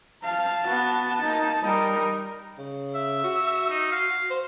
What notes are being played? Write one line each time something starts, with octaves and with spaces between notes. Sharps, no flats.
F5 A5
B3 F#4
A#3 D#4
G3 D#4 A#4
C#3
E5
F#4
D#4
F5
C5